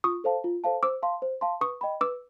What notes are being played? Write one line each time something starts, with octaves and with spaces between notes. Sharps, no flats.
F4 C#6 D#6
A4 C5 F5 A5
F4
A4 C5 F5 A5
C5 D6 E6
F5 A5 C6
C5
F5 A5 C6
B4 C#6 D#6
D#5 G5 B5
B4 D6 E6